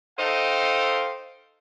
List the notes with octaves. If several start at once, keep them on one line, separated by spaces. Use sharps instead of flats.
D#4 A4 C5 D#5 F5 G5